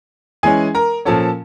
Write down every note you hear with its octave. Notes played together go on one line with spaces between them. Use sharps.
E3 G#3 C#4 G#4 G#5
A#4 A#5
A#2 F3 A#3 C#4 A4 A5